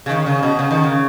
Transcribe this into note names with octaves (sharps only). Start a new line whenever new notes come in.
C#3
D#3
C#3
B2
C#3
D#3
C#3